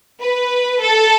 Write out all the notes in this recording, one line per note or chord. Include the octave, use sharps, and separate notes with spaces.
B4
A4